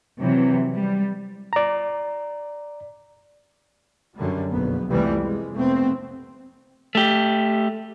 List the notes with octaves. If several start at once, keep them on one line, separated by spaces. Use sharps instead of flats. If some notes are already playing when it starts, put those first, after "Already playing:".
C3 E3 F#3
G3
D5 A#5
F#2 D3 G3
F#1 B1 F2 B3
C2 F2 C3 E3 G3 A3
G#3
F1 A3 B3 C4
A3 G4